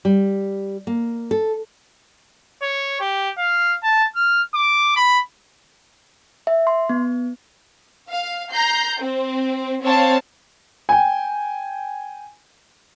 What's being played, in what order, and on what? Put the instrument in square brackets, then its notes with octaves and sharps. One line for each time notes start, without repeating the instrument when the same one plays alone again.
[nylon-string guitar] G3
A#3
A4
[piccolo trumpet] C#5
G4
F5
A5
F6
D6
B5
[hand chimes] E5
C6
B3
[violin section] F5
A#5 G6 C7
C4
C4 C#5 F5 A5
[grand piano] G5 G#5